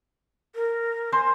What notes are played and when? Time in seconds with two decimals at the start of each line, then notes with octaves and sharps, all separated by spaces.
0.55 A#4
1.12 C5 G#5 C6